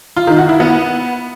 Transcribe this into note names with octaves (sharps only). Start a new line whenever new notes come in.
F4
D#3
F#4
E4
B3